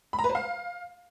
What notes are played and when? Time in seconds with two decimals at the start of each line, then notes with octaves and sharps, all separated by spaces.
0.13 B5
0.19 A#5
0.24 B4
0.29 C5
0.35 F5